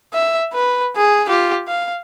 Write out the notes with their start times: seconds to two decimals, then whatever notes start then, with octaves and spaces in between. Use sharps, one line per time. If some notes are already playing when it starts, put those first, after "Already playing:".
0.13 E5
0.53 B4
0.96 G#4
1.28 F4 G4
1.67 F5